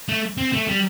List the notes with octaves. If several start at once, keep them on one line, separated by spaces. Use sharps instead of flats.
A3
C4
A3
G3